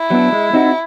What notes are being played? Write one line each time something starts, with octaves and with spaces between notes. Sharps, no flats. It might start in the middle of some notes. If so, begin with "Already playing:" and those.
Already playing: E4
F#3 B3 D4
G#3
C4 D#4 F#4